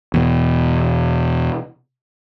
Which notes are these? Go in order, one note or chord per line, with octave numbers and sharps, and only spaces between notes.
E2 B2